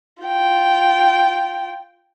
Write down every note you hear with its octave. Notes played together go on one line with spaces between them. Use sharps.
F4 G5